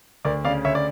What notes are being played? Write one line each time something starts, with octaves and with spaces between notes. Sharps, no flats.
D2 A#4 D5
C#3 D5 F5
D2 C#5 E5
D5